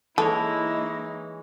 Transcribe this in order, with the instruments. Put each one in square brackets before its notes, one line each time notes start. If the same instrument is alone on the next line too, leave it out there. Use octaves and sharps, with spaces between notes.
[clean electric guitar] E3 G#3 C#5 [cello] A#3 D#4 [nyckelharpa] E4 [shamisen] A4